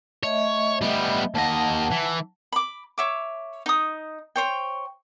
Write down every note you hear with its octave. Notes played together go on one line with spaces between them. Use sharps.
A3 C#5 D#5 E5
G3 B3
D#2 D#5 F#5 A5
E3
B5 D6
C#5 E5 D6
D#4 D#6
C5 C#5 G5